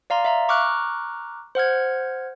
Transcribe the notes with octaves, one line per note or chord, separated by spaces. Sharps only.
D5 F5 A#5 C6
E5 F5 A#5
A#5 C#6 D6 F6 F#6
C5 F#5 F6 G#6